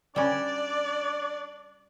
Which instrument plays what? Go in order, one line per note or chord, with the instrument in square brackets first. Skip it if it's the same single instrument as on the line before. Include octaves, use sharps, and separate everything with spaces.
[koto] G3 C#4 [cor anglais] D4 [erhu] D5